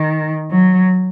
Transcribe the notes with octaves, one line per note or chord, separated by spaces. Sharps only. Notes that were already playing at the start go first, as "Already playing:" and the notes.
Already playing: D#3
F#3